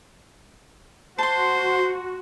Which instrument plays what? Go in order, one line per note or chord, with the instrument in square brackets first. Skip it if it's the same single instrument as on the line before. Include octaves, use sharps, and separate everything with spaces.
[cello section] F#4 [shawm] C5 [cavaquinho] A5 C6